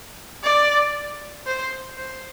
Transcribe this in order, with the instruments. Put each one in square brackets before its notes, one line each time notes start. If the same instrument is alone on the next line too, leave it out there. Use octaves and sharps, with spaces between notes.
[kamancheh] D5
C5
C5